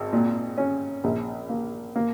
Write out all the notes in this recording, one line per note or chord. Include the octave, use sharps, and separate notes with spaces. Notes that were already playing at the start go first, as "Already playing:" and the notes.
Already playing: G#1
A#2
C#4
A#1
A#3
A#3